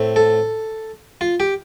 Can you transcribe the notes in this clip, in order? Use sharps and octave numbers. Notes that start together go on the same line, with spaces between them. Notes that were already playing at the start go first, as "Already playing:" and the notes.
Already playing: A2 A3 C4
A4
F4
G4